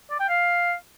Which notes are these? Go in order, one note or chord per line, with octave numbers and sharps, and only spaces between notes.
D5
G5
F5